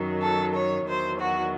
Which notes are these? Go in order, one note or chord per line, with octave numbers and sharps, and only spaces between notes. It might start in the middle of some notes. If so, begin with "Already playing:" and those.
Already playing: F#2 D#3 F#3
A4
C#5
E2 D#3 F#3 C5
F#4